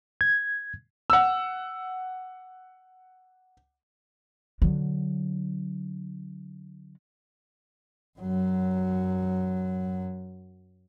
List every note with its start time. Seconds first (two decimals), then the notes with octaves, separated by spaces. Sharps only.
0.21 G#6
1.10 F#5 E6
4.62 D3 F#3
8.19 F#2 F#3